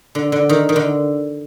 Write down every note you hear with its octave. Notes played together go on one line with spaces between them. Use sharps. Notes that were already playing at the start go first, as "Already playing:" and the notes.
D3
D3
D#3
D#3
D3